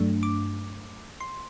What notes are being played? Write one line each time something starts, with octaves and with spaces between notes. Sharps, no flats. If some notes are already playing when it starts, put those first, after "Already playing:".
Already playing: G2 F#3 A3 D4
D6
C6